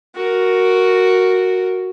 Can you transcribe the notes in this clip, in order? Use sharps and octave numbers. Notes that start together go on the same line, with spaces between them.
F#4 A#4